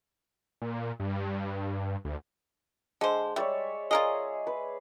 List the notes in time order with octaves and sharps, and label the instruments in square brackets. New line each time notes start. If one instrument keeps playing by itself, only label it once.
[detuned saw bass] A#2
G2
D2
[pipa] D3 C5 [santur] G#3
[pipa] G3 [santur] C#5 D5 E5
[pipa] F4 A#4 D#5 [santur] G#4 G#5
[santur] B4